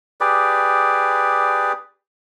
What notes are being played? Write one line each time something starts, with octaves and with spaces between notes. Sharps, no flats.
G4 G#4 B4 D5